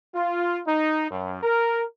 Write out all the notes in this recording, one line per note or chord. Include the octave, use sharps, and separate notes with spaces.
F4
D#4
F#2
A#4